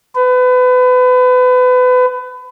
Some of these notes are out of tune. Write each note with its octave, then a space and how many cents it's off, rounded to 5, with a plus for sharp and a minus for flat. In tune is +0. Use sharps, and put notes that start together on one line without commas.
B4 +30